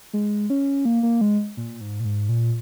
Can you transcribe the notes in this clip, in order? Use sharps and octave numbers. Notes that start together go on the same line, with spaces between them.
G#3
C#4
A#3
A#3
G#3
A#2
G#2
A#2
G#2
A#2